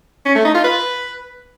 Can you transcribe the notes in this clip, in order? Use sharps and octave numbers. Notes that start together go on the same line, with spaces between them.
C#4
A3
D#4
F4
B4